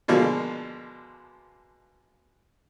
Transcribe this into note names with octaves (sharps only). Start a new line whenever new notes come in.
B2 D3 F3 G#3 A#3